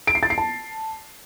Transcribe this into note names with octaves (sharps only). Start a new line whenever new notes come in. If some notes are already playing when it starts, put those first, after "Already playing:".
D7
C7
A6
C7
A5